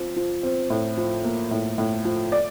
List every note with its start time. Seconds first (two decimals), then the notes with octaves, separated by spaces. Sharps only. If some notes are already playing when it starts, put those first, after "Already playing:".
Already playing: F3 C4
0.16 F3
0.43 C4
0.70 A2
0.97 F3
1.24 A#3
1.51 A2
1.78 A2
2.05 F3
2.32 D5